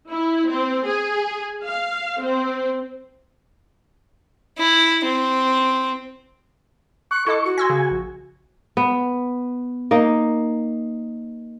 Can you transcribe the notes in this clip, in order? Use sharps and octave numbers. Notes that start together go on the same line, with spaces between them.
E4
C4
G#4
F5
C4
E4
C4
C#6 F#6
E4 A4 D#5 D6
F#4
G#5 C6 E6 A#6
C#3
A#1
B3
A#3 D#4